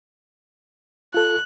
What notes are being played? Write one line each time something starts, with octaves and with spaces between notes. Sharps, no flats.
F4 A4 F#6